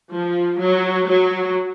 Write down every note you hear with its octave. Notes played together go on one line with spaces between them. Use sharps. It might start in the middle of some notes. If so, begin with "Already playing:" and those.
F3
F#3
F#3